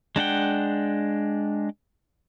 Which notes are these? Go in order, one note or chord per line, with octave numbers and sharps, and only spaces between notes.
G#3 D4 F#5 G5